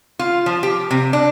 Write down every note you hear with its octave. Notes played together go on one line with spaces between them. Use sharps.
F4
F3
G4
C3
D4